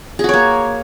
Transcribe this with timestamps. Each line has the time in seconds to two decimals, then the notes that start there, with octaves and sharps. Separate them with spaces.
0.19 G#4
0.24 F#4
0.29 C#5
0.34 A#3